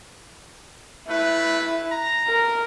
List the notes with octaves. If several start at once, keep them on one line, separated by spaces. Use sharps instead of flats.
A3 E4 B4
A#5
A#4